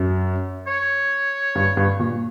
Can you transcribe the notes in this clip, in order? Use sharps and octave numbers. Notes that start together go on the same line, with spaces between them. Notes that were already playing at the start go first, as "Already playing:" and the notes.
Already playing: F#2
C#5
G2
G2
A#2